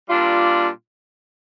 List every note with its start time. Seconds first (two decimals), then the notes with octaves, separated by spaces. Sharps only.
0.08 A#2 G3 D4 F4